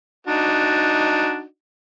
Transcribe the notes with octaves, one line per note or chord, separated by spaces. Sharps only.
D4 D#4 F#4